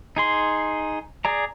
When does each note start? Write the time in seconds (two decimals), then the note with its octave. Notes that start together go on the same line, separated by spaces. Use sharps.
0.17 D#4 G#4 C6
1.25 G#4 D5 A#5